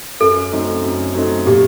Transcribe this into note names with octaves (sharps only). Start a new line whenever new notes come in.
F#2 A4
F#3 A3 C4 D#4
F#2
F#3 A3 C4 D#4
A#2 G4